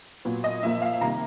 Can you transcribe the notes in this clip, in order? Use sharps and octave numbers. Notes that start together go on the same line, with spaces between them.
A#2 F#3 B3
D#5
A#2 F3 A#3 E5
F5
C3 D#3 G3 A#3 A#5